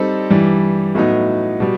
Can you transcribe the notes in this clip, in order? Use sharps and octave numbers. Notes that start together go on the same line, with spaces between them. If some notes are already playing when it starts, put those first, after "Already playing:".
Already playing: G3 C4 D#4 A4
G2 E3 G3
A2 F#3 B3 D#4
B2 G3